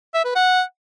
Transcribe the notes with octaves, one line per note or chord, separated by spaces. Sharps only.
E5
B4
F#5